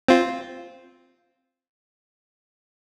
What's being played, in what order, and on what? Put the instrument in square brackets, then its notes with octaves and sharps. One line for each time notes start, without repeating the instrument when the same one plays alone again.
[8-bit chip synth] C4 F4